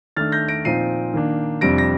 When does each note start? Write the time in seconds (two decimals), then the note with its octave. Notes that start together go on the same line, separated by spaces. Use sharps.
0.17 D#3 A3 D4 F6 A6
0.32 G6 A#6
0.48 A#6 D7
0.65 A#2 F3 C4 D#4 C7 D#7
1.14 D#3 A#3 D4
1.61 F2 C3 G3 D4 A#6 D7
1.78 A#6